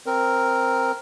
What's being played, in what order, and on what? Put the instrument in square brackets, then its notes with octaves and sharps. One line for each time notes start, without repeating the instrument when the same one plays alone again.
[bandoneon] C4 A#4